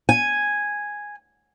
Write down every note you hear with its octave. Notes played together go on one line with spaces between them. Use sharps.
G#5